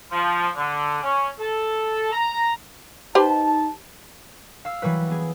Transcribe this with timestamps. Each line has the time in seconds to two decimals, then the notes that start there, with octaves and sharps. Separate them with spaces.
0.12 F3
0.56 D3
1.03 C#4
1.39 A4
2.13 A#5
3.15 D#4 G4 B4 C5 A5
4.65 F5 E6 C7
4.82 E3 F#3 G3 B4
5.08 B3 G#4